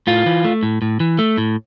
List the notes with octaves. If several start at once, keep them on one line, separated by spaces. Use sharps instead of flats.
A2 F4
E3
A3
A2
A2
E3
A3
A2